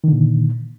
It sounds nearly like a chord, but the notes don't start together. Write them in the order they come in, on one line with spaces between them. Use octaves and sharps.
D#3 D3 A#2